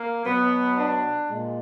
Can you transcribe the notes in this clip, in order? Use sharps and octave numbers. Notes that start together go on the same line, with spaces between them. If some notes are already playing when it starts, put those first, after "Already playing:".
Already playing: A#3
B2 F#3 B3
D4
A#2 G#3